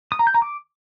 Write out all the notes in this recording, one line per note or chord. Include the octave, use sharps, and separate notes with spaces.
D#6
A#5
G6
A#5
D6